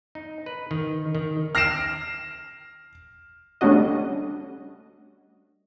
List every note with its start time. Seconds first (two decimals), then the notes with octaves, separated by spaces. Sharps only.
0.15 D#4
0.46 B4
0.71 D#3
1.15 D#3
1.55 F6 A#6 C7 D7 E7
3.61 G3 A3 C#4 D4 F#4 D#5